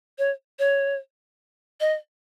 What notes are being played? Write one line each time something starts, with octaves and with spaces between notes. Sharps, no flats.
C#5
C#5
D#5